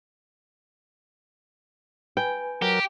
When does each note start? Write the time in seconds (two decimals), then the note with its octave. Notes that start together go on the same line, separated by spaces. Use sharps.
2.17 B4 G5 G#5
2.62 F#3 G4 A#4